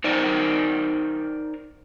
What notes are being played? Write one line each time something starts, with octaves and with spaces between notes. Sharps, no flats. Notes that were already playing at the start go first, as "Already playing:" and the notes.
D#4 A#4 C5 D5